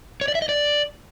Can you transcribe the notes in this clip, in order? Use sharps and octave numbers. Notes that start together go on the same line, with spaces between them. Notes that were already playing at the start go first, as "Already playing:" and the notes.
C#5
D5
E5
D#5
D5